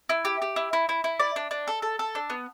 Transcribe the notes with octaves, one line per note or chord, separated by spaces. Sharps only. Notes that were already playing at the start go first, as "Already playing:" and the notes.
E4
G4
G4
E4
E4
E4
E4
D5
D4
D4
A4
A4
A4
D4
B3